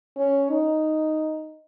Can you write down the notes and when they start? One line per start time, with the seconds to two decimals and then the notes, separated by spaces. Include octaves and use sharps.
0.17 C#4
0.50 D#4